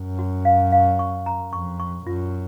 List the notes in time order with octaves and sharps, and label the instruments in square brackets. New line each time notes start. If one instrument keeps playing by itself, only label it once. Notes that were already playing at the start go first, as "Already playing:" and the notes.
Already playing: [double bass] F#2
[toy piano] F#4
F5
F5
C#6
A#5
[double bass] F2 [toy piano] C#6
[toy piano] C#6
[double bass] F#2 [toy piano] F4